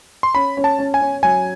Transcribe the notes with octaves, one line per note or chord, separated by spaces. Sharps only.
C6
C#4 B5
C#4
A5
C#4
G#5
C#4
F#3 G#5